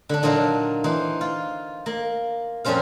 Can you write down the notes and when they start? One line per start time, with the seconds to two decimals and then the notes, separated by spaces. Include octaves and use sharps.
0.09 D3 D4
0.23 A#2 F#3 D4 D#4 F5
0.84 E3 D#4 C5
1.21 F4
1.86 A#3
2.65 F2 A#2 G3 C#4 C5 F5